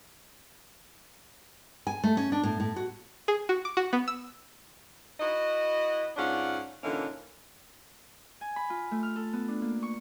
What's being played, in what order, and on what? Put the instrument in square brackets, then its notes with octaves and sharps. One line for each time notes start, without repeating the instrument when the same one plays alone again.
[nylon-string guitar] G#5
A3
C#4
D4
A2
A2
F#4
[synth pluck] G#4
F#4
D6
F#4
B3
E6
[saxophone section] E4 F#4 B4 D#5
G#2 C#4 D4 F4 F#5
A#2 D3 E3 A#3 C#4 D#4
[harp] G#5
B5
F4
A3
F6
A4
B3
D4
A#3
C#6